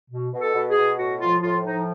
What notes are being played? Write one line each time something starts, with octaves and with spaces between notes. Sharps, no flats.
B2
B2
A4
B2
G#4
B2
A2 F#4
F3 F4
A2 F4
F3 D#4